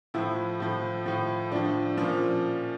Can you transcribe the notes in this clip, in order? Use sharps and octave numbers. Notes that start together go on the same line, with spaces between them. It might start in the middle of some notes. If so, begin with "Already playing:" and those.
A2 F3 E4
A2 F3
A2 F3
A2 F3 D4
A#2 F3 C#4